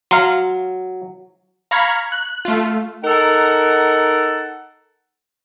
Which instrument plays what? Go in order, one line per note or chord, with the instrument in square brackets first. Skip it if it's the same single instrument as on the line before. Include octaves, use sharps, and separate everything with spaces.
[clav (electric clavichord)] F#3 [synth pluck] F5 A#5 C6
[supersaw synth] F5 A#5 B5 C#6 F6 G#6
F#6
A3 F4
[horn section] D#4 A4 A#4 F#5